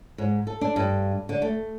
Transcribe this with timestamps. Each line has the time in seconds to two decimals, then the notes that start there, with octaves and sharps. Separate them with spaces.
0.18 G#2
0.47 A4
0.61 D4
0.76 G2
1.29 D3
1.42 A3